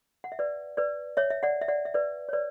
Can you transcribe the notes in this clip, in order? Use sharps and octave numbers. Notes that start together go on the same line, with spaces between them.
F#5
E5
B4 D5
B4 D5
C#5 E5
E5
D5 F#5
E5
D5 F#5
E5
B4 D5
C#5
B4 D5